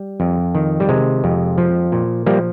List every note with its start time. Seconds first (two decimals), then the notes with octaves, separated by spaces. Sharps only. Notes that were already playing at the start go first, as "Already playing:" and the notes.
Already playing: G3
0.20 F2
0.55 D#3
0.80 G3
0.89 C3 G#3
1.24 F2
1.58 F3
1.92 A#2
2.26 F3 G3 A#3